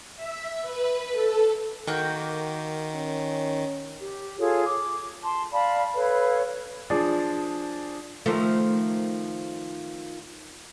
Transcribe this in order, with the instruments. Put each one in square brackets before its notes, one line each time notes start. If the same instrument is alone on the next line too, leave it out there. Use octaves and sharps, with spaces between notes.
[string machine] E5
B4
A4
[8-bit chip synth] D#3 [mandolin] A#3 F#4 G5
[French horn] C#4
[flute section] G4
F4 G#4 A4 C#5
D6
A5 C6
D5 F5 A5 B5
A4 B4 C#5 F5
[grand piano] F3 D4 G#4 D5
[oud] D#3 F3 A3